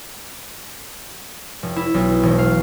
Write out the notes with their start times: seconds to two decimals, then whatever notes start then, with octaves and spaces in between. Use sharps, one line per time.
1.63 F1
1.76 E4
1.94 B1
2.23 E1
2.38 F5